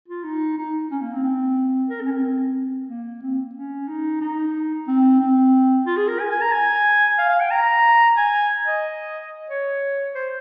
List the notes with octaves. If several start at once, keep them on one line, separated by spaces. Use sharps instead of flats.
F4
D#4
D#4
C#4
A#3
C4
C4
A#4
C4
C#4
C4
C4
A#3
C4
C#4
D#4
D#4
C4
C4
F4
G#4
A#4
G#5
G#5
A#5
G#5
F5
F5
G5
A#5
G#5
D#5
C#5
C5